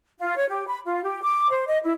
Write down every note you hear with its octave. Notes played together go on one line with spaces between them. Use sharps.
F4
C#5
G4
B5
F4
G4
D6
C5
D#5
E4